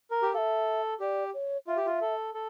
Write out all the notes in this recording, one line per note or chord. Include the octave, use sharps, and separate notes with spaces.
A#4
G4
A4 E5 F5
G4 D5
C#5
F4 E5
G4
F4
A4
A4